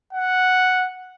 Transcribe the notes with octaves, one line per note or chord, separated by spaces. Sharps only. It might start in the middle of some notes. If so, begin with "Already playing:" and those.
F#5